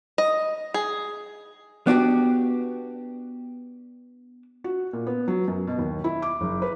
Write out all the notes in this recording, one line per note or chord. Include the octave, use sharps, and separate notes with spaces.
D#5
G#4
B3 D4 F#4 G4
F#4
A#2
B3
F#3
F#2
B2
D#2
E4
D6
F#1
B4